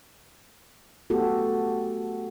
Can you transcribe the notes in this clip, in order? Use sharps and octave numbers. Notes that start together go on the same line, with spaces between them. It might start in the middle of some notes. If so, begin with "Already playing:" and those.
A3 B3 F#4 G4 A4